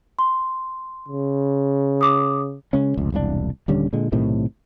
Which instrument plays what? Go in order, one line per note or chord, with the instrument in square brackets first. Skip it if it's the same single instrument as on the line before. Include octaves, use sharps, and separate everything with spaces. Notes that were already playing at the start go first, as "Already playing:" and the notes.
[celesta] C6
[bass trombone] C#3
[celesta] D6 D#6
[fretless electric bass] C#3 G#3 C#4
F1 C#2
E1 C2 B2 D4
D#1 D3 G3 C#4
A#2 D3 G#3
B1 A2 C3 D#3